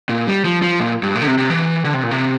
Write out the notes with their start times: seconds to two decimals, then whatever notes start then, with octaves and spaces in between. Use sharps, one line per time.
0.09 A#2
0.27 G3
0.45 F3
0.62 F3
0.80 A#2
1.03 G2
1.15 A#2
1.21 D3
1.27 C3
1.38 C3
1.50 E3
1.85 D3
1.94 C3
2.03 A#2
2.11 C3